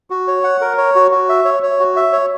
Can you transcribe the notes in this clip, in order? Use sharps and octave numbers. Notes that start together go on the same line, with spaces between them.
F#4
C#5
F#5
A#4
C#5
F#4
F#4
E5
C#5
C#5
F#4
E5
C#5